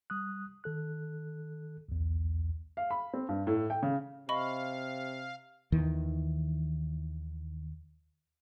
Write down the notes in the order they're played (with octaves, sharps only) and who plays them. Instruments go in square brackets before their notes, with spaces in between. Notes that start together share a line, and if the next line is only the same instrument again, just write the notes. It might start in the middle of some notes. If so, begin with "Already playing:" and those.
[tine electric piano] G3 D#6 F#6
D#3 A4 F#6
B1 E2
[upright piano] F5
B5
C4
G2
A2
G5
C#3
[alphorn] C3 [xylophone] D#5 B5 C#6 [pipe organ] F5
[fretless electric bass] D#2 D#3 E3